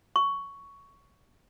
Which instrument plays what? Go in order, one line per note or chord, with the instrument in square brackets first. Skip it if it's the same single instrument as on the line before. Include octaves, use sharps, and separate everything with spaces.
[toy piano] C#6